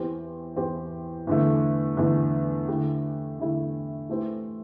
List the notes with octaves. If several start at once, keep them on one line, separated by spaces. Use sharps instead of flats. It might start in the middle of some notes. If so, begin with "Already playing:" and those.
Already playing: E2 E3 C4 G4
E2 E3 C4 G4
E2 D3 A3
E2 D3 A3
D3 A3 E4 G4
D3 A3 E4 G4
E3 A3 C4 G4